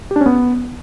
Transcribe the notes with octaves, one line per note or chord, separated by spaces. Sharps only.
G4
D4
C#4
B3